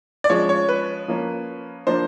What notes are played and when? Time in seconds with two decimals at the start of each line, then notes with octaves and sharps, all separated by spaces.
0.24 D5
0.30 F3 G#3 C#4 C#5
0.49 C#5
0.69 B4
1.08 F3 A#3 C#4
1.87 F3 A#3 D4 C5